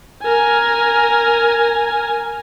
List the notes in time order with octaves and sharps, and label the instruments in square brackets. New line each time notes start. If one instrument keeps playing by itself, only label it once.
[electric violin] A#4 G#5